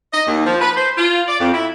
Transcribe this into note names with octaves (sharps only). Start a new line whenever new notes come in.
D#5
D#2
F3
B4
C5
F4
D5
F2
E4